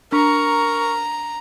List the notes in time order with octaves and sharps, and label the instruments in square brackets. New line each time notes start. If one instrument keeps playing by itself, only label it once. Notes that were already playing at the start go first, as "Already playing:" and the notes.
[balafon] D4 [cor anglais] A#4 [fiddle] A#5 [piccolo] C#6